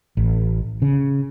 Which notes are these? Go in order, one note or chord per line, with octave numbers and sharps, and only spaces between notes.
A1
C#3